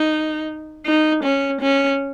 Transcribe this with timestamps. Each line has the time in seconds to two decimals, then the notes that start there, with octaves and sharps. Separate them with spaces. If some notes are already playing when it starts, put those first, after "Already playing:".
Already playing: D#4
0.86 D#4
1.24 C#4
1.61 C#4